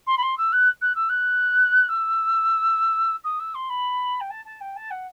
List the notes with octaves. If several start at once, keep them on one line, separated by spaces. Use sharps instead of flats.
C6
B5
C6
E6
F#6
F#6
E6
F#6
E6
D#6
E6
C6
B5
G5
A5
A5
G5
A5
F#5